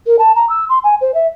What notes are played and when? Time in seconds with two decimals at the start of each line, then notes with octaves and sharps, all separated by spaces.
0.07 A#4
0.19 A5
0.35 A#5
0.49 E6
0.69 C6
0.84 G#5
1.01 C5
1.14 E5